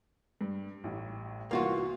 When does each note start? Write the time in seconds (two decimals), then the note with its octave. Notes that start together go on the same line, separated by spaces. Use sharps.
0.41 G2
0.84 A1 A2
1.51 C2 E3 A#3 F4 F#4 C6